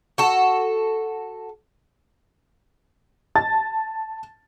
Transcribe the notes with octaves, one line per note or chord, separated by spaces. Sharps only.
F#4 A4
A5 A6